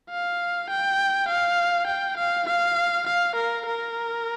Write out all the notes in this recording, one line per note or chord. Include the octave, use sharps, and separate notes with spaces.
F5
G5
F5
G5
F5
F5
F5
A#4
A#4